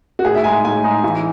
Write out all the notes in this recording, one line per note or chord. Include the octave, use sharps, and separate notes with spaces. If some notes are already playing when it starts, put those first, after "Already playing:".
F#4
A2 G#4
E5
G#3 D#4 G#5
A2 G#5
G#3 D#4
E3